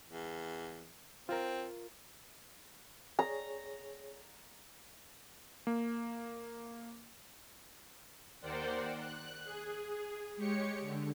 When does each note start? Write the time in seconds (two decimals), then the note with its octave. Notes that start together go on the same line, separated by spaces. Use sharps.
0.07 E2
1.29 C4 F4 A#4
3.19 G#4 C#5 A#5
5.67 A#3
8.40 D#2 A#4 C5 D5 F#5 G5
8.96 F#6
9.45 G#4
10.36 G#3 G4 C#5 C#7
10.81 D3